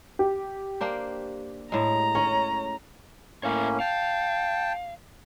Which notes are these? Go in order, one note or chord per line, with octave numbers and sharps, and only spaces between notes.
G4
A#3 D4 C5
A2 G#3 A#5
C#4 C#5
A2 A#3 C#4 C#5 E5 F5
F5 G5 A5